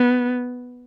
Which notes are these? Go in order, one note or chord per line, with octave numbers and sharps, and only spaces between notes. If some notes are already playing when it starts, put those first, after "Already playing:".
Already playing: B3